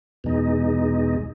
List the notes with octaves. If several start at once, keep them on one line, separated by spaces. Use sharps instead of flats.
E2 B2 G#3 D#4